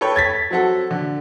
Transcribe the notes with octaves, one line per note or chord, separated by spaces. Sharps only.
A4 B4 C#5 G5
G#6 A6 B6
F#3 C4 F#4 A4
D3